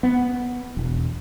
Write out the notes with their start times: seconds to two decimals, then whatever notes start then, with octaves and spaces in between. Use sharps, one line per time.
0.03 B3
0.77 E1